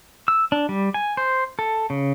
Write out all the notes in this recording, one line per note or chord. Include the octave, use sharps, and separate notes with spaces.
E6
D4
G3
G#5
C5
A4
C#3